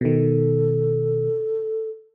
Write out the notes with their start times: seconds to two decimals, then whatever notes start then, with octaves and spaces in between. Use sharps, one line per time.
0.01 B2 D#3 A4